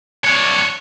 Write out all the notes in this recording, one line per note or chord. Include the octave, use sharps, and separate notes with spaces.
D4 C#5